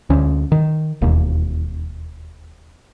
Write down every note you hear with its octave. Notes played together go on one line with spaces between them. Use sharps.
D2 C#4
D#3
E1 D#2